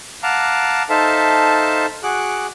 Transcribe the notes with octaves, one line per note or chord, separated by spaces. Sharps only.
F5 F#5 A5 A#5 D6
D#4 A4 C5 E5 F5 A5
F#4 G#4 D6 F#6